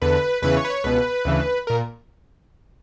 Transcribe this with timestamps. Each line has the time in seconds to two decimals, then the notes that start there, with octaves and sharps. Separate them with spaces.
0.02 E2 D3 B4
0.42 E2 C#3 E3 B4
0.57 C#5
0.65 B4
0.70 C#5
0.84 C#2 B2 B4
1.25 D2 C#3 E3
1.67 A#2 A#4